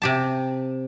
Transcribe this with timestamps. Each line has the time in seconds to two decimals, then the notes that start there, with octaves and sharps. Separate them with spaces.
0.02 C3 G4 A5